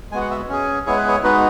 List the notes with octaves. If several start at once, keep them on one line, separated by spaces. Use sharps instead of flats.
G#3 B3 F#4 G#5
F#5
E5
C#4 G#4
G#3 B3 E4 G#4 C#5
B4
C#5
G#3 B3 D#4 F#4 B4